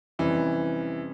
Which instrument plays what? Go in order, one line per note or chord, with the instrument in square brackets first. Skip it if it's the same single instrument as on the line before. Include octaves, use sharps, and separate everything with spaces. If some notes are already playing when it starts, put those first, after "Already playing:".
[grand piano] F2 C3 G3 C#4 [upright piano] E3